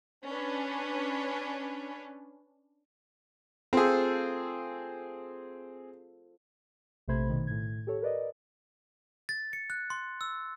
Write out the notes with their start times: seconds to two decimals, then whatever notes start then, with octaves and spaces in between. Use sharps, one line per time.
0.25 C#4 D4 B4
3.73 C4 F4 G#4 A4 C5
7.08 A#1 C3 A3 C5 B5 G#6
7.30 B2 D#3
7.47 A2 G#6
7.87 G4 A4 C#5
8.02 A#4 B4 D5 D#5
9.29 A6
9.53 C#7
9.70 F#6
9.90 C6
10.21 E6